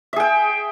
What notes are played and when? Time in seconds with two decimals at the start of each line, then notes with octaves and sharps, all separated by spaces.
0.13 E5
0.16 G#4
0.20 G5